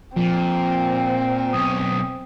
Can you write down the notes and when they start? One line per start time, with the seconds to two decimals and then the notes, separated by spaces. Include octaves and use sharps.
0.16 A#2 F3 C4
1.53 B1 C#4 D#6